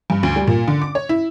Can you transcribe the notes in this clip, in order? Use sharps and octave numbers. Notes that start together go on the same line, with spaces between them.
G2
D2
G3
A#2
D3
D6
C#5
E4